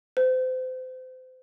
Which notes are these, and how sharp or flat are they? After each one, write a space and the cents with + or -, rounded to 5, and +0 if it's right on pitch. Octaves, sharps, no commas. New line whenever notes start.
C5 -30